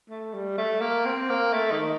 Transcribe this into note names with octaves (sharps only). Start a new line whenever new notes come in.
A3
G3
A3
A#3
C4
A#3
A3
D#3